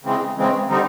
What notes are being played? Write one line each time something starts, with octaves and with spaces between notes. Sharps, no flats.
C#3 E3 G#3 C4
C#3 E3 G#3 C4
D3 G3 C4 D#4